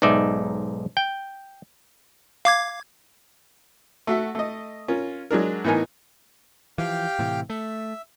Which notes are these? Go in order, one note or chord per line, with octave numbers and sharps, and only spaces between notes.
B1 G#2 D#4 D5 E5
G5
F5 D6 G#6
A3 F#4 E5
A3 D#5
C#4 F4 A#4
F#3 G#3 D4 A#4
A2 E3 B3 D#4 A#4 G#5
E3 F3 G4 F5 G5
A2 C3 E3
A3 E5